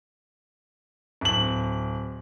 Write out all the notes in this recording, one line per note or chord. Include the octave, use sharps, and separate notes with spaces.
D1 F#7